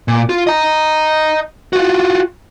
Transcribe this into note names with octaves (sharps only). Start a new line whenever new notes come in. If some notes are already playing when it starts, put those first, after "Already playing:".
A#2
F4
D#5 A#5
F4 F#4